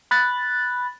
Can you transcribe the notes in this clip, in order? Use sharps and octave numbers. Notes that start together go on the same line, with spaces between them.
B5 F#6 A6